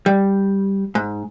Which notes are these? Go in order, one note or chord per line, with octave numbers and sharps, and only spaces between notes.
G3
G#2